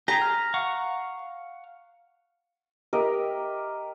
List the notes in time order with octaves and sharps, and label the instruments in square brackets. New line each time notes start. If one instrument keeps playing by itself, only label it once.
[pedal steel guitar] G4 G#4 [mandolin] A#5
[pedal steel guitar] F6
F5 F#5 C#6
[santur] G4 A#4 D#5 E5